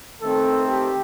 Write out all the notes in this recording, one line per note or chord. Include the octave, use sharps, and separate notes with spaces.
D#3 A3 C4 A4
G4